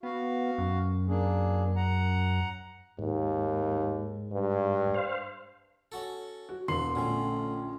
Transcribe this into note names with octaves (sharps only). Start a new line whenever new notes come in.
B3 F#4 F5
F#2
A#3 D4 G#4
F#5 A#5
D#2 G#2
G2
C5 F5
C#4 F#4 A4
F#4
E1 A#3 C6 C7
A#1 D3 A3 C#4